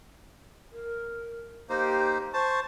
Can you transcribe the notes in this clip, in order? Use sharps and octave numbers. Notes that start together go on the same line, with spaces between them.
A#4
A#3 D#4 G4 C5
C5 A5 C#6